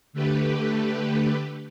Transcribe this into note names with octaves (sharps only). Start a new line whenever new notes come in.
D3 A3 G4 B4